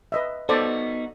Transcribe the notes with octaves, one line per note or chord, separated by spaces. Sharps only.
B4 D#5 E5
B3 D#4 F#4 A4 C5 D5